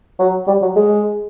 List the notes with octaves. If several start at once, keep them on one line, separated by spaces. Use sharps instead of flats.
F#3
G3
F#3
G#3